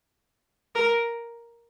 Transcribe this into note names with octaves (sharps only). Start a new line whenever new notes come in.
A#4